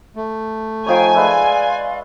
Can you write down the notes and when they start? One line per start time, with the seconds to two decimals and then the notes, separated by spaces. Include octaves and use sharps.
0.16 A3
0.86 F3 D#4 C#5 F5 G5 G#5
1.15 G#3 B4 D5 E5 F5 C6